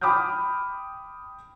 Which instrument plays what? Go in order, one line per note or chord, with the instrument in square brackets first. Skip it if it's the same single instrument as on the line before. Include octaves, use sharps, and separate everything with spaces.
[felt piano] G5 B5 D6 D#6 F6 G6